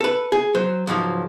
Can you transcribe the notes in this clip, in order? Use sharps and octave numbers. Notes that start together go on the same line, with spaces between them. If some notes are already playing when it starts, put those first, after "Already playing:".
A4 B4
G#4
F#3 C5
C#2 G#2 F3 F#3